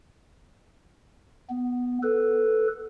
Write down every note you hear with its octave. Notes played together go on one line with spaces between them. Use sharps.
B3
A4 B4